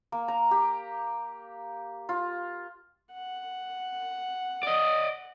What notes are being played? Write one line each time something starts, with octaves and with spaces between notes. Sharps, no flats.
A#3
A#5
G4
F4
F#5
D5 D#5